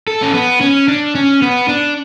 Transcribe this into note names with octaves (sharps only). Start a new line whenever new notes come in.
A4
C#4
B3
C#4
D4
C#4
B3
D4